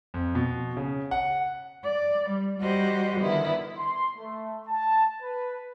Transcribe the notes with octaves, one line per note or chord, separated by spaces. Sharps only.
F2
B2
C#3
F#5
D5
G3
G3 F#4 G4 C5 D#5
D3 D#3 B3 E4
C6
A3
A5
B4